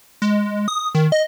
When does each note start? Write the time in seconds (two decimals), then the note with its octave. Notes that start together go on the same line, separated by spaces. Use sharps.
0.22 G#3
0.68 D#6
0.95 D#3
1.12 D#5